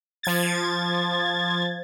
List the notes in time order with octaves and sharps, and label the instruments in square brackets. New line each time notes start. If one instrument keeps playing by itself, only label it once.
[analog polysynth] F3 G#6 A6